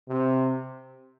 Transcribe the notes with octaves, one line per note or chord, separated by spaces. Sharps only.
C3